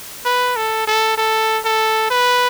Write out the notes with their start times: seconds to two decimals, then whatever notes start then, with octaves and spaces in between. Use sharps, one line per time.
0.25 B4
0.56 A4
0.87 A4
1.18 A4
1.65 A4
2.11 B4